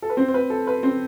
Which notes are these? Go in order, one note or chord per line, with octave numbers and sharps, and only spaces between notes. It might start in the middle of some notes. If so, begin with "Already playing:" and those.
A4
B4
C4 C5
C5
B4
A4
B4
C4 C5